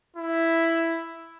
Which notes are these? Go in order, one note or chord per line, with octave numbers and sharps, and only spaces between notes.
E4